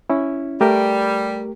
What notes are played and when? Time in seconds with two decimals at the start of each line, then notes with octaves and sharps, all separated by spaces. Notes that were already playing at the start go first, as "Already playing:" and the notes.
0.10 C#4 E4
0.61 G3 A3 G4 A#4